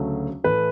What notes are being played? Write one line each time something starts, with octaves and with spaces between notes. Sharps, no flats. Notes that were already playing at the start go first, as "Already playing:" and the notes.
Already playing: D2 C#3 F#3 A3
A2 E3 A3 B4